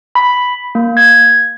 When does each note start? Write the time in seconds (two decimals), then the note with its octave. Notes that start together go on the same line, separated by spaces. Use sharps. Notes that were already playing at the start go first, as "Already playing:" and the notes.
0.15 B5
0.75 A#3
0.97 G#6